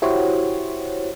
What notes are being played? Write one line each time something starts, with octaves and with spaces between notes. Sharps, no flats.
E4 F#4 G4 C5 C#5